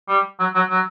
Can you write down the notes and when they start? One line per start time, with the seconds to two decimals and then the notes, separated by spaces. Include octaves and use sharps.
0.09 G3
0.39 F#3
0.55 F#3
0.70 F#3